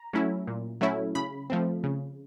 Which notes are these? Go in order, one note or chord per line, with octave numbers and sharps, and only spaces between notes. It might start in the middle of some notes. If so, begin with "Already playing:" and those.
Already playing: A#5
F#3 A3 C#4 E4
A#2
F#3 A3 C#4 E4
C#3 B5
F3 A3 C4
C#3